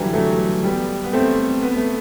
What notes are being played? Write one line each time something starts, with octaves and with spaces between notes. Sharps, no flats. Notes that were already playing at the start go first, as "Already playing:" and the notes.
Already playing: D3 E3 F#3 G3
F#3 A3
G3 B3
B3
A3 C4
B3
A3